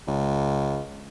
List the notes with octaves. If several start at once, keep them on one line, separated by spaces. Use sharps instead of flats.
C#2